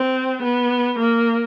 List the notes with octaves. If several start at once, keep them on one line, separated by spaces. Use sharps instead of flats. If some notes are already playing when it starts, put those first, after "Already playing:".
Already playing: C4
B3
A#3